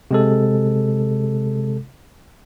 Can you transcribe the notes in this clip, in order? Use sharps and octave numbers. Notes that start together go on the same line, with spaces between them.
C3 G#3 A4